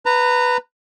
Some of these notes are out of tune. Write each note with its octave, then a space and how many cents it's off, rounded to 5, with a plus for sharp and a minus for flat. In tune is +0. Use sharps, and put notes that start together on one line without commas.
B4 +0 A#5 -25